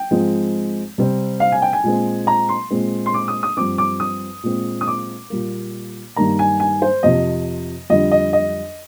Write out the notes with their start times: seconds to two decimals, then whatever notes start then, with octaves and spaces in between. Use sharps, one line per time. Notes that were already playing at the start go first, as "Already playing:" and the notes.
Already playing: G5
0.11 G#2 F3 G#3 C4
0.98 C3 G3 C4
1.40 F5
1.52 G#5
1.62 G5
1.73 G#5
1.84 A#2 G#3 C4
2.27 A#5
2.49 C6
2.71 A#2 G#3 C4
3.06 C6
3.14 D6
3.28 D#6
3.43 D#6
3.57 G2 F3 C4 D6
3.78 D6
4.00 D#6
4.43 A#2 G#3 C4
4.81 D#6
4.87 D6
5.30 A#2 G3 A#3
6.16 G2 D#3 A#3 A#5
6.39 G#5
6.60 G#5
6.82 C5
7.03 F2 C3 F3 D#5
7.90 F2 D3 G3 D#5
8.11 D#5
8.33 D#5